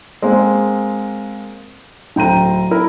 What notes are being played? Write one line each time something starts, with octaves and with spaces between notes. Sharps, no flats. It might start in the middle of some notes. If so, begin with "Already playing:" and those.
G#3 A#3 C4
D1 G5 A#5 D#7
E4 A#4